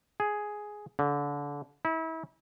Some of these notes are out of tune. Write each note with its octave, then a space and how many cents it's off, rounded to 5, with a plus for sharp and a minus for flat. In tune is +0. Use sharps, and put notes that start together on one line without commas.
G#4 +5
D3 -30
E4 -35